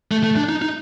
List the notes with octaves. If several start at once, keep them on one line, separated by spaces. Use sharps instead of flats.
A3
A3
D4
D#4
D#4